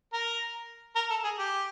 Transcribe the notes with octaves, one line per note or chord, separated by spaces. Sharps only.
A#4
A#4
A4
G#4
G4